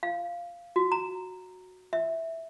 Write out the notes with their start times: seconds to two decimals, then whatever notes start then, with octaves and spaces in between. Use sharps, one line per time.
0.03 F5
0.76 F#4
0.92 A#5
1.93 E5